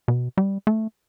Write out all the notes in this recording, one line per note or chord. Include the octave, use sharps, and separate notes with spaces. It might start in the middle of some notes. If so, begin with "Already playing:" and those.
B2
G3
A3